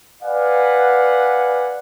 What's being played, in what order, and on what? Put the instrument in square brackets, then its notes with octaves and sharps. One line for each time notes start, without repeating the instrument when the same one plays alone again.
[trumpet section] B4 D5 F5 F#5 G#5